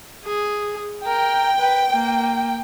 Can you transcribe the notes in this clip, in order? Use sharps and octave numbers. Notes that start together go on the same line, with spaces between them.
G#4
A#4 G5
B4
A#3